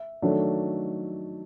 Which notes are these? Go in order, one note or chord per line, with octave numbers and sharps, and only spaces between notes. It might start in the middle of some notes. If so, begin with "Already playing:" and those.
Already playing: E5
D#3 F#3 A3 D4